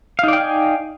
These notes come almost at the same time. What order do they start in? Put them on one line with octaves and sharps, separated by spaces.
F5 D#4 D5 G5 G#5